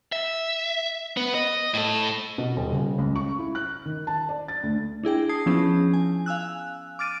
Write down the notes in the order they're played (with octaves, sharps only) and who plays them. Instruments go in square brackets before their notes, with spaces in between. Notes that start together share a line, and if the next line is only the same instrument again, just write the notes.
[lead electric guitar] E5
B3
D#5
A2 A4
[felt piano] B2
D#1
C#3
C#2
C#6
E4
F#6
D#3
A5
D5
A6
D2
[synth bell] D4 E4 G#4 G5
A5 D#6 G#6 C7
F3 B3 C#4 E4 G#4
G#5
F5 G#5 E6 F#6
D6 F6 A6 D7 D#7